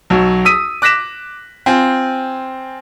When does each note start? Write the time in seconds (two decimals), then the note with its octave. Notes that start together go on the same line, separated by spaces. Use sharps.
0.10 B1 F#3
0.45 D#6 E6 B6 D#7
0.82 D6 F#6 A#6 B6 E7
1.66 C4 F4 G#5